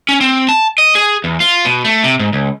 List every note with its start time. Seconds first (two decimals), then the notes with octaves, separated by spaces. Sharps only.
0.09 C#4
0.21 C4
0.49 A5
0.78 D#5
0.95 G#4
1.24 E2
1.40 F4
1.65 B2
1.85 A3
2.04 C3
2.20 G#2
2.33 C#2